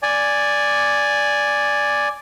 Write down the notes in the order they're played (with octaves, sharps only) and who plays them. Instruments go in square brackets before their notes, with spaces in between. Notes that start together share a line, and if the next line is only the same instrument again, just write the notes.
[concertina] D5 G#5